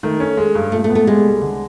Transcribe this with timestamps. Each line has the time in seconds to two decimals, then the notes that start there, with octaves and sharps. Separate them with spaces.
0.03 D#3 A3
0.20 C#4
0.37 G#3
0.55 G2
0.72 A#2 A3
0.84 A3
0.90 B3
0.95 A3
1.07 G3 G#3
1.24 C2
1.42 D3